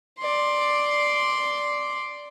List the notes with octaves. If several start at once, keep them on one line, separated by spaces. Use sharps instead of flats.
D5 C6